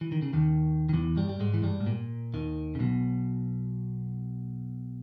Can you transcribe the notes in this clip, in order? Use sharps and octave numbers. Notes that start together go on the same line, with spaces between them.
E3
D#3
C#3
D#2 D#3
D#3
E2 E3
G2 G3
G3
G#2 G#3
E3
G2 G3
G#2
A#2
D#2 D#3
C#3
B1 B2